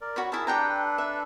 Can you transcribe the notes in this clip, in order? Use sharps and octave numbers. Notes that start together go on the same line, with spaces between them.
A#4 D5
F#4 C#5 B5
E4 G#4 A#4 A5 E6
D4 G4 A4 B4 G5 A#5
E5